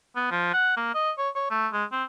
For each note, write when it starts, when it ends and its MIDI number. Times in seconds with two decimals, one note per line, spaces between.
0.16 0.27 59
0.31 0.50 53
0.53 0.75 78
0.77 0.91 58
0.94 1.11 75
1.18 1.29 73
1.35 1.48 73
1.50 1.68 57
1.73 1.84 56
1.92 2.03 60